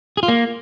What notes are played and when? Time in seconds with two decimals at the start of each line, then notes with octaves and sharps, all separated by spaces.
0.17 G#4
0.23 F4
0.28 A#3